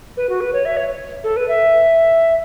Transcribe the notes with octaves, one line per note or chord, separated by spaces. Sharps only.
B4
F#4
B4
C#5
E5
C#5
A4
B4
E5